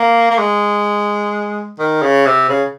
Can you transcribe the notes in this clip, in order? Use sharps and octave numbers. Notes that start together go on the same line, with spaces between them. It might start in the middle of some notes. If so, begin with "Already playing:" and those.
Already playing: A#3
A#3
G#3
D#3
C#3
C3
C#3